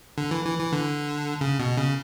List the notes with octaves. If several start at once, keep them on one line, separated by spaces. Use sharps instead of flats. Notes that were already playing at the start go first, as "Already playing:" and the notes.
D3
E3
E3
E3
D3
C#3
B2
C#3